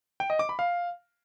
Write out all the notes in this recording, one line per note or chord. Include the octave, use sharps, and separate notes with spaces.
G5
D#5
D6
B5
F5